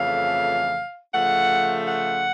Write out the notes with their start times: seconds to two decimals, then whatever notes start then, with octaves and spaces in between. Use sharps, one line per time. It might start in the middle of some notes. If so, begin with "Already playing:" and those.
Already playing: F2 C#3 E3 A3 F5
1.13 C#3 F3 A3 F#5
1.88 F#5